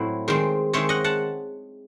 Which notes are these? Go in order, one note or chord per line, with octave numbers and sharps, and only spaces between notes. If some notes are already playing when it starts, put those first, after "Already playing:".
Already playing: A2 F#3 C4 E4 F#4
D#3 G#3 C4
D#3 G#3 C4 C#5 E5
D#5 F#5
F#5 A5